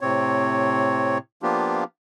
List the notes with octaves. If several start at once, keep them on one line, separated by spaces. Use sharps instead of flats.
A2 C3 C4 C#5
F3 A#3 B3 D4 F4 G4